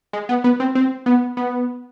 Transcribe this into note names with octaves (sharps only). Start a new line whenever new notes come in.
G#3
B3
B3
C4
C4
B3
B3